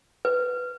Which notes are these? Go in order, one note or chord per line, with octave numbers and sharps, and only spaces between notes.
B4